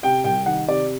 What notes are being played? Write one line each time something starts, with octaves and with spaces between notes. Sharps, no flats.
C3 G5
C2 G5
D#3 F#5
C3 D5